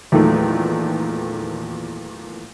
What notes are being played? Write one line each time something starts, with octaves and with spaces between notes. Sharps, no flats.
E2 A#2 D#3 F#3 A3